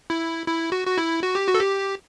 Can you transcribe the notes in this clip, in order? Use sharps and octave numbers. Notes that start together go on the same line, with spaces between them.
E4
E4
F#4
F#4
E4
F#4
G4
F#4
A4
G4